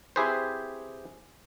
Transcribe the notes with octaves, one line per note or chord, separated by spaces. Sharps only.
C4 E4 G4 G#4 B4 C5